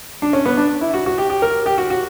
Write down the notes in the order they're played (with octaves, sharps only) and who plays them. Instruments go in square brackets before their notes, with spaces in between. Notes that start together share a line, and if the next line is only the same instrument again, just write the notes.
[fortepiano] D4
C#4
B3
D4
E4
F#4
F#4
G4
G4
A#4
G4
F#4
F#4